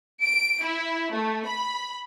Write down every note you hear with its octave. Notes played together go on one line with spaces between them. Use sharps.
D7
E4
A3
B5